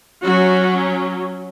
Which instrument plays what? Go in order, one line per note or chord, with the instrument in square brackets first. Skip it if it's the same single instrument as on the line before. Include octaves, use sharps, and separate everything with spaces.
[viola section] F#3 C#4 F#4